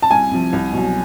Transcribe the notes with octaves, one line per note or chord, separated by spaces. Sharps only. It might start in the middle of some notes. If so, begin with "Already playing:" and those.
A5
C2 G#5
C3 F3
C2
B2 F#3